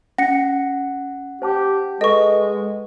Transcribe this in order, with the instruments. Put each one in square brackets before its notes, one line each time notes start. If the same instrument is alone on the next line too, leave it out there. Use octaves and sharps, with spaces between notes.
[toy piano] C#4 [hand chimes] F#5 [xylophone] A#6 C#7
[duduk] G4 [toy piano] C5 A5 D6
[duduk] G#3 [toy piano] A4 B4 [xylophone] D#5 C#6